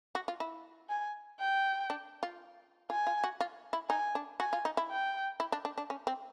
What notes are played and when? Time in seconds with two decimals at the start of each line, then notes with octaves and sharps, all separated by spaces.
0.15 F#4
0.28 F4
0.40 E4
0.89 G#5
1.40 G5
1.90 D4
2.23 F4
2.90 F4 G#5
3.07 F4
3.24 F#4
3.41 F4
3.73 E4
3.89 D#4 G#5
4.15 D4
4.40 F#4 G#5
4.53 F4
4.65 D#4
4.77 E4
4.90 G5
5.40 E4
5.52 D4
5.65 D4
5.78 D4
5.90 C#4
6.07 C4